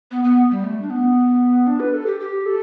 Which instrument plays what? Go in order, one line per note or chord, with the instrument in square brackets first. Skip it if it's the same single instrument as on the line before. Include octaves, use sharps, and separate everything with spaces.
[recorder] B3
B3
G3
A3
D4
B3
D4
B4
A4
G4
G4
A4